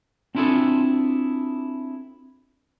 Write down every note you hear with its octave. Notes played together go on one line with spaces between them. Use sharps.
C4 D4 E4 F4 G#4 A4